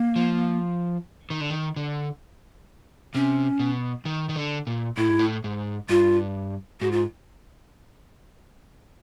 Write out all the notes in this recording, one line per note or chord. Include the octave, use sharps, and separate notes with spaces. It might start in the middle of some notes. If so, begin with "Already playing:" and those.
Already playing: A#3
F3
D#3
D3
D#3
D3
C3 C#4
B2
D#3
D#3
D3
A#2
A2 E4
G#2
A2
G#2
G2 F4
G#2 F#4
F4